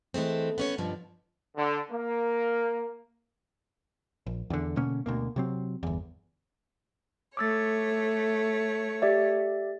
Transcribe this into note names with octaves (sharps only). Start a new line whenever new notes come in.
E3 G#3 A3 C4
B3 C#4 C#5
G2 B2 D3 F3
D3
A#3
A#1
E2 D3
B2 D3 A#3 C#4
D2 B2 A#3
C3 F#3 C4
G1 E2
A3 C#5 D6 E6 A6
G4 D5 E5